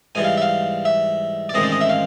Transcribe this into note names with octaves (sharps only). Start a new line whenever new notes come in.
G#2 E3 G3 G#5
F5
E5
F5
E5
D5
A1 G#2 D#3 G#3 C4 D#5
D5
D#5
E5
F5